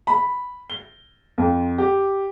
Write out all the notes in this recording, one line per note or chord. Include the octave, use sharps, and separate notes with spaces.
B5
G7
F2
G4